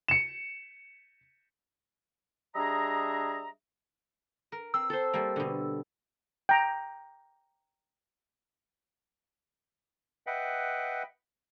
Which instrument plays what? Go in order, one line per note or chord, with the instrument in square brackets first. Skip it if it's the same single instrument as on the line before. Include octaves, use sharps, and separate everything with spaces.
[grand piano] C#7 E7
[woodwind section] G3 D4 G#4 D#5 E5 A#5
[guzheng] A#4
[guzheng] C4 [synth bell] E6
[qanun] A4 C5
[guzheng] G3 A#3
B2 D3
[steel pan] G5 A#5
[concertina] B4 D#5 E5 F#5 G5